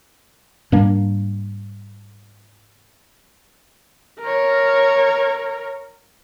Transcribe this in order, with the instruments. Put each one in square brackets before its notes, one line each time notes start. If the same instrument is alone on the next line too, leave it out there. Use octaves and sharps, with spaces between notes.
[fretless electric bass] G#2 G3 A#3 D4
[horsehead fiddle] A#4 C#5